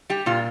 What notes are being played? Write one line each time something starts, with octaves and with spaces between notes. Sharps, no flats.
G3 G4
A#2 F4